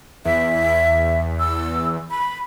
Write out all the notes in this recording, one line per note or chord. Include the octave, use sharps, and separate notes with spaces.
E2 E5
E6
B5